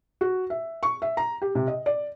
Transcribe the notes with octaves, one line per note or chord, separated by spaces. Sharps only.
F#4
E5
C#6
E5
A#5
G4
C3
D#5
D5